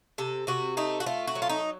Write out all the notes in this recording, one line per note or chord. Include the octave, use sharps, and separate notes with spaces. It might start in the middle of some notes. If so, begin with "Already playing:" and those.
C3 A4
C3 F#4
A3 D#4
F#4
A3 F4
F#4
F#3
F4
D#4